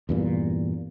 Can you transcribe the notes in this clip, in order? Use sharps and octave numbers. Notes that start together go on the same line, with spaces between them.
E2 G2 A#2